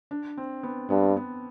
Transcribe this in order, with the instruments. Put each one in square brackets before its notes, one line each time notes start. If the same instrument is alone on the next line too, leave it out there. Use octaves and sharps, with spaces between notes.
[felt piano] D4
C4
B3
[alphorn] G2 [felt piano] B3
[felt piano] B3